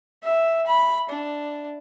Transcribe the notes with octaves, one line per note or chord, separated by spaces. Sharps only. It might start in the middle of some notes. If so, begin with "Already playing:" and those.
E5
B5
D4